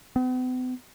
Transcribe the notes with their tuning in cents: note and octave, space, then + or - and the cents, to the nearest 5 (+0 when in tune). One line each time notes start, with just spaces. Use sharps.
B3 +45